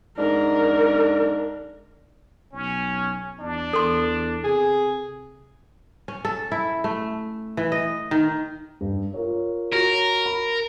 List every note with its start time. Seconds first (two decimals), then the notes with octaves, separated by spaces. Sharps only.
0.18 G#2 D4 A#4
2.53 B1 C#4
3.40 E2 D4
3.73 E2 A4 C6
4.44 C3 G#4
6.08 C#4
6.25 A4
6.52 E4
6.84 A3
7.57 E3
7.72 D#5
8.11 D#3
8.81 G2
9.14 F4 A#4 C#5
9.72 F#4 A#4 C#5
10.26 B5